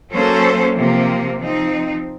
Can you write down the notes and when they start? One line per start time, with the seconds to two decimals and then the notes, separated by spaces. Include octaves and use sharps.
0.11 F#3 A#3 C#4 A4 C5
0.75 C3 F3 A#3
1.39 F3 C4 D#4